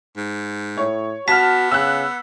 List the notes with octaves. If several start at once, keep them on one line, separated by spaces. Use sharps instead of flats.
G#2
A2 C#5
B3 F#4 A5 F6 B6
C#3 E6 F#6